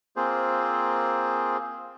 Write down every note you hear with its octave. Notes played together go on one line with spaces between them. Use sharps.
A#3 C4 F4 G#4 C5